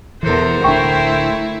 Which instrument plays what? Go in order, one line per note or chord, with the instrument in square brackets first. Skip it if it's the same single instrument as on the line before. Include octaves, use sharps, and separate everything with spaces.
[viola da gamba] E2 A4 [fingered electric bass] B2 E3 [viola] A#4 C5
[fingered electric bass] D1 D2 D4 [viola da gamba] A3 E4 [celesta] G5 C#6